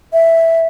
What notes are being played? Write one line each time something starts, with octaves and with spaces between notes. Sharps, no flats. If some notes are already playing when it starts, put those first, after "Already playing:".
E5